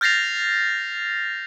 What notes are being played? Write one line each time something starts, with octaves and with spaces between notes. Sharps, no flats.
F6 G6 A6 A#6 C7 F7